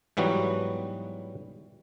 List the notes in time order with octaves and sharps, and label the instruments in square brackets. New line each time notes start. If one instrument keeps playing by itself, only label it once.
[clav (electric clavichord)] G#2 E3 F#3 G3 B3 F#4